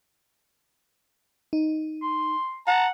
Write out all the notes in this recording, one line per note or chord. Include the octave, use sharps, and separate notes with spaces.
D#4
C6
F#5 A5 A#5